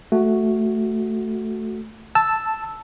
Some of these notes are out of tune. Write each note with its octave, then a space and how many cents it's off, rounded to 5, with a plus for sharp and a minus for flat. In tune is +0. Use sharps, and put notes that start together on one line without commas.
A3 +0 F#4 +0
A5 +0 E6 +0